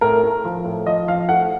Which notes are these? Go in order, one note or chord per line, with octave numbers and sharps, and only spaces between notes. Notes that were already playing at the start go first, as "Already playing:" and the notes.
A2 A#4
A3
F3
A2
F3 D#5
F3 F5
A3 F#5